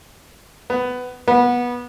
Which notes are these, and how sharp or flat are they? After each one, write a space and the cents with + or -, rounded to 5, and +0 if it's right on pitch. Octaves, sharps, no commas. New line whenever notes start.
B3 +15
B3 -20